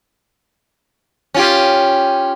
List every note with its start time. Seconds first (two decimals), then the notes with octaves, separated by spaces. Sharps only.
1.34 C#4 F4 G4